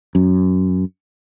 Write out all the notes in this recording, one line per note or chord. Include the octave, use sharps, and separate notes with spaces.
F#2